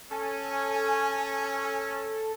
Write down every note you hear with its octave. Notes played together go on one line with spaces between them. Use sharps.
C#4 A4 G#5